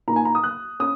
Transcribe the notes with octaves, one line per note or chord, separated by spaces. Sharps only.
A#2 A#3 D#4 A#5
G#5
A#5
D#6
F#6
C#4 D#6